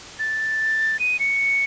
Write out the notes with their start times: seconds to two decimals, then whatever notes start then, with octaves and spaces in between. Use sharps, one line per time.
0.19 A6
1.00 D#7
1.20 C#7